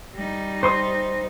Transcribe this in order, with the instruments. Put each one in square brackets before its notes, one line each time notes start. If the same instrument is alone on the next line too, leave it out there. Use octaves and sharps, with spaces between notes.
[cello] G3 D#4
[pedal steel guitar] C5 C6 D#6